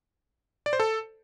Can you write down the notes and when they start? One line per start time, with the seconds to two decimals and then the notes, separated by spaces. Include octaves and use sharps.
0.66 D5
0.73 C5
0.80 A4